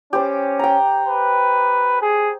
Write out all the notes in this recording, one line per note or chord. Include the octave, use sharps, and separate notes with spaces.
C#4 G4 C5 D5
G5 A#5
B4
G#4